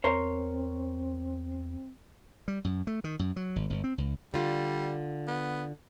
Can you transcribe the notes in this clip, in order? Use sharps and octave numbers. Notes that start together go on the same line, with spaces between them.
E2 C4 A#4 C5 C#5
G3
F#2
A3
D#3
F#2
F#3
G#1
G1
C4
C#2
D3 G3 F4
B3